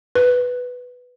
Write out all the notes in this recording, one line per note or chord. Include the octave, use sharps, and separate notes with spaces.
B4